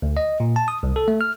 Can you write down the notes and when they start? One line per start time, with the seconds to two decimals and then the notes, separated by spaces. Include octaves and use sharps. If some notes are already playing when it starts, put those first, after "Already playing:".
0.02 D2
0.17 D#5
0.40 A#2
0.56 A5
0.68 D#6
0.83 C2
0.96 A4
1.08 A3
1.21 F6